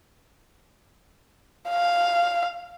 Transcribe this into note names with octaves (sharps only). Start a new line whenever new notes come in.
F5